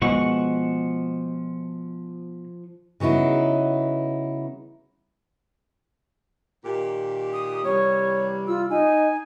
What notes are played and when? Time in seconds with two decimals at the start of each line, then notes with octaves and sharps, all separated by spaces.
0.02 B2 F3 G#3 F#5 C#6
3.00 C#3 F#3 B3 D#4 E4
6.65 A#2 D#3 G4
7.33 D#6
7.64 C3 E3 G3 C#5
8.47 F4 E6
8.70 D#4 G#5